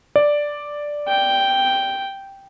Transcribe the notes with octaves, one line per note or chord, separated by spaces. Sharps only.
D5
G5